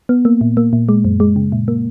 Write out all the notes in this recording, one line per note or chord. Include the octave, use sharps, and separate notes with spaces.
B3
A#3
A#2
A#3
A#2
G#3
F#2
G#3
C#3
A#2
A#3